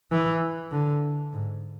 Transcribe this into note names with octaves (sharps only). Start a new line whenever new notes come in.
E3
D3
G#2